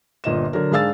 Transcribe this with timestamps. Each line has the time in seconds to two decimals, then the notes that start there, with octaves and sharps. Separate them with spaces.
0.24 G1 A#2 D#5 E7
0.53 D3 F#3 A#4
0.71 G#2 D4 G#4 F5 E6 A6